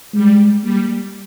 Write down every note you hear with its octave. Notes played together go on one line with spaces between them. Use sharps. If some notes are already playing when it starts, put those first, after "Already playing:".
G3 G#3
G3 A#3